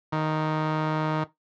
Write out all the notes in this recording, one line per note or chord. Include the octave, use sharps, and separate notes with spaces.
D#3